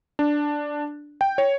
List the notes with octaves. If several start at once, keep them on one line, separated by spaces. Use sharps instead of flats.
D4
G5
C#5